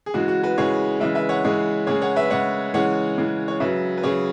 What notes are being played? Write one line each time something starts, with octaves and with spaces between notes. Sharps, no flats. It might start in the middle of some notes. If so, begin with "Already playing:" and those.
G#4
C#3 E3 G#3 F#4
F#4
F#4 B4
C#3 E3 G#3 G#4 C#5
C#3 E3 G#3 B4 E5
B4 E5
C#5 F#5
C#3 E3 G#3 G#4 C#5
C#3 G#3 G#4 C#5
C#5 F#5
B4 E5
C#3 G#3 C#5 F#5
C#3 E3 G#3 C#5 F#5
C#3 E3 G#3
C#5
C#3 F#3 B4 E5
B4
C#3 F#3 G#4 C#5